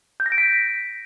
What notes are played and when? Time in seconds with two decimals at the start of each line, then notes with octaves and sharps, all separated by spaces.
0.20 G6
0.26 A#6
0.32 D7
0.38 B6